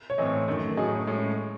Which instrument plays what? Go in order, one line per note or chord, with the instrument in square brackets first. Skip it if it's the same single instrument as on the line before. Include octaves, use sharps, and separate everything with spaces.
[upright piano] C#5
[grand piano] A2 E3 C4 [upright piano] D#5
[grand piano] F#2 D#3 A3
[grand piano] A2 F#3 C#4 G#4 [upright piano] D#5
[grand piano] A2 G#3 C#4